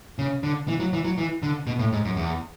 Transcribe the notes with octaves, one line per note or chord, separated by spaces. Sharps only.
C#3
D3
E3
F#3
E3
F#3
E3
D3
B2
A2
G#2
F#2
E2